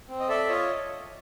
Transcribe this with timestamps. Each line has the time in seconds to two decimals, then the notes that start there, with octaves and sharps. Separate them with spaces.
0.08 C4
0.20 D#5
0.29 A4 D5 E5
0.49 F4 C#5 D#5